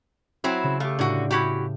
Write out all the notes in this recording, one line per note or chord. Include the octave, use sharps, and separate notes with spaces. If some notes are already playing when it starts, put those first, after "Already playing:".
F#3 C4 E4
C#3
A3 G4 F5
A2 D3 F#4
E4 F#4 G4